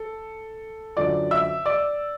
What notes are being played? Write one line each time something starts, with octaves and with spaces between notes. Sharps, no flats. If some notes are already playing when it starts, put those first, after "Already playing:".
Already playing: A4
F#2 D3 F3 D5 D6
E5 E6
D5 D6